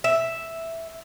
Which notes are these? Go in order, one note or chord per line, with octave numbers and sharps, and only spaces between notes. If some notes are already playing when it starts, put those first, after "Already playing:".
E5